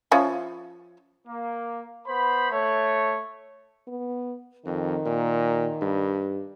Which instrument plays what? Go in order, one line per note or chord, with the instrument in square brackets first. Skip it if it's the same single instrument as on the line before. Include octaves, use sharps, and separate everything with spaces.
[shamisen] F3 C#4 E4
[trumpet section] A#3
B3 C5 B5
A3 C#5
[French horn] B3
[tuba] F2 [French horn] D#3
[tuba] A#2
G2